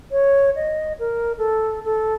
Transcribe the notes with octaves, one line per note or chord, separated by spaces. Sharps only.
C#5
D#5
A#4
A4
A4